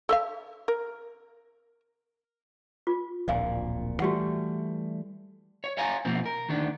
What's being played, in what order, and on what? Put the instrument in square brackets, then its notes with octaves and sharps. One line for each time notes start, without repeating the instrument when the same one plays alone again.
[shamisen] A4 E5 F5
A#4
[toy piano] F4
[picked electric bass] D1 A#1 A#2 [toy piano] D5 F5 G#5
[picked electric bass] E3 G3 A3 [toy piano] F#4 G4 F#5
[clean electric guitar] C#5
C#5 F5 G#5 A#5
B2 F3 A#3 C4
A#4
D2 D#3 D4